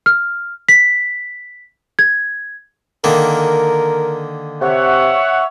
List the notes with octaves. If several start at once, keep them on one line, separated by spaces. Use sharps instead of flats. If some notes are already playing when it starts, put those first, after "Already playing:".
F6
B6
G#6
D3 D#3 A#3 A#4
C3 C#5 E5 F#5